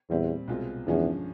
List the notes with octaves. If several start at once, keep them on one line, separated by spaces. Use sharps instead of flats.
E2 A#2 G3 C4
C2 B2 G#3 C4 F4
E2 G2 D3 F3 G#3 C#4